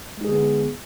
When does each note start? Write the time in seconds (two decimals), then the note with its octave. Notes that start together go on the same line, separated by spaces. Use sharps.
0.17 G#3
0.21 D#4
0.25 G#4
0.28 D3
0.32 B3